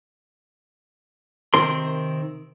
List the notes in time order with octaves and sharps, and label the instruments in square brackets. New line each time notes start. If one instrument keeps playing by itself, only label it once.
[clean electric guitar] C3 D#3 C4 A#4 C6